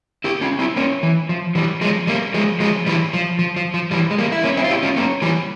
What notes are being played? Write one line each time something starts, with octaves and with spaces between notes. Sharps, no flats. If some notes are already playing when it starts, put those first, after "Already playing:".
E4 G4
C#4 F4
C4 E4
A#3 C#4
E3
F3
E3 G3
F3 G#3
G3 A#3
F3 G#3
F3 G#3
E3 G3
F3
F3
F3
F3
E3 G3
G#3
G3 A#3
E4
A#3 C#4
C4 E4
F4
E4 G4
C#4 F4
A#3 C#4
E3 G3